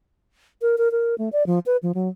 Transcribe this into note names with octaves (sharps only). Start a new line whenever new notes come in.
A#4
A#4
A#4
A3
D5
F3
B4
F3
F#3